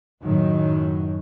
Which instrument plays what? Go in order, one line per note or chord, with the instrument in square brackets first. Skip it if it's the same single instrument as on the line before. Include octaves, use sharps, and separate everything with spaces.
[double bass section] F#2 A2 D#3 F#3